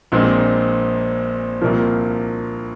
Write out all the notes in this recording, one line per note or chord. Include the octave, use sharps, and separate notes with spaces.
A#1 A#2 G#3 C4
C2 A#2 F3 A#3